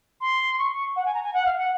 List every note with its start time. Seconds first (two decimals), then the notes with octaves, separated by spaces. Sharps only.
0.20 C6
0.58 C#6
0.71 C#6
0.96 F#5
1.05 G#5
1.14 A#5
1.23 G#5
1.33 F#5
1.45 F5
1.57 F#5